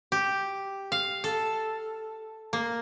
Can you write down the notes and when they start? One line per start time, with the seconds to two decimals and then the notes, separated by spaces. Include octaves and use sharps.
0.12 G4
0.92 F5
1.24 A4
2.53 A#3